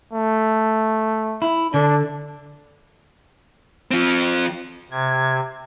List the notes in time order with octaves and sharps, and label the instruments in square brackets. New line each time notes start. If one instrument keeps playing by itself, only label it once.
[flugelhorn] A3
[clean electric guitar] E4
[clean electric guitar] D3 [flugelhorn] D4
[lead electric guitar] F3 C4
[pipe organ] C3 G#6